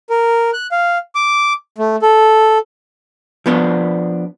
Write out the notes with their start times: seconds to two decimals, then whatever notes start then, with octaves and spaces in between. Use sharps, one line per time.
0.10 A#4
0.53 F#6
0.72 F5
1.15 D6
1.78 A3
2.02 A4
3.46 F3 B3 D4